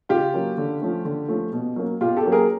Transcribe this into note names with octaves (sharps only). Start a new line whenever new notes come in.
C#3 F4 G4
F#3 A#3 C#4
D3
F3 A3 C#4
D3
F3 A3 C#4
B2
F#3 A#3 C#4
B2 F4 G4
G4 A4
F#3 A#3 C#4
G#4 A#4